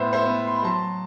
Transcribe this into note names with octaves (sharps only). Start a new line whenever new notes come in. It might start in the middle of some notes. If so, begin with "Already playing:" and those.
Already playing: A2 B3 C5 E5
C5 E5
B3
C6
B5
F#3 A5 C6